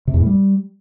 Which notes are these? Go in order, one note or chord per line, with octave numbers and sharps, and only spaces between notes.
C3
E2
A2
G3